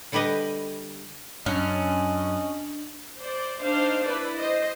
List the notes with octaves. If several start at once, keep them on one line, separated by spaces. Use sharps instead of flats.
D3 G3 G4 B4 D#5
F#2 C#4 D4 D#5
C5 D5
D4 D#4 C5 F5
E4 B4 D5
C5 D#5